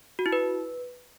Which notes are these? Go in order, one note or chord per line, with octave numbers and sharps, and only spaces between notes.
F#4
E4
B4